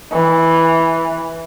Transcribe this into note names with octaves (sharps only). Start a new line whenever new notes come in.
E3